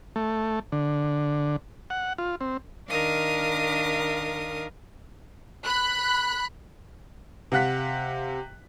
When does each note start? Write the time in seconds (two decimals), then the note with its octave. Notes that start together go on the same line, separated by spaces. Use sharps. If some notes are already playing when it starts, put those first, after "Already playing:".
0.16 A3
0.72 D3
1.90 F#5
2.18 F4
2.41 C4
2.89 D#3 D4 A#4 F5 D#6
5.65 B5 F#6
7.52 C3 F5 F#5 F#6 B6